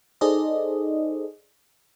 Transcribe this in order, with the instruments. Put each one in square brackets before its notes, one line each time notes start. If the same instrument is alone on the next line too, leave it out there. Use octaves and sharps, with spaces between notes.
[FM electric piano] D#4 G#4 A4 C5 D5 D#5